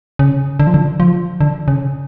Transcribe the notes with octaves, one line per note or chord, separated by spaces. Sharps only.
C#3
D3
F3
D3
F3
D3
C#3